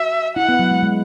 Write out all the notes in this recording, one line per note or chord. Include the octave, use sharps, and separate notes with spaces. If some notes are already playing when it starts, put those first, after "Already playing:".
Already playing: F#4 E5
E4 F#5
B3
F#3
G#3
G#3